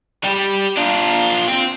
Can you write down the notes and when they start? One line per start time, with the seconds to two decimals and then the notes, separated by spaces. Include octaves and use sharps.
0.24 G3 G4
0.77 D4 F4
1.48 C4